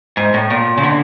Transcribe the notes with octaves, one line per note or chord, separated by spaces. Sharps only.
G#2
A2
A#2
C#3
D3